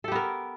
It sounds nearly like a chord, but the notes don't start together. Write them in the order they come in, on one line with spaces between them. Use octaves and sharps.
A4 G4 B3 A#4